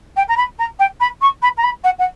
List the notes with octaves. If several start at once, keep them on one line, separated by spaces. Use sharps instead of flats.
G5
A#5
B5
A#5
G5
B5
C#6
B5
A#5
B5
F#5
F#5